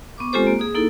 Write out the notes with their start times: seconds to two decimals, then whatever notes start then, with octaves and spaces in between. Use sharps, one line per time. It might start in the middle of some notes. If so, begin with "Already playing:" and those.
0.18 B3 C#6 D6
0.33 G#3 C4 F4 G4 A4 C5
0.47 A#3
0.60 G#4 D#6
0.75 A#3 D#4 E4 A4